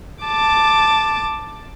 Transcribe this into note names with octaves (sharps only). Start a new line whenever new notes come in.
A5 D6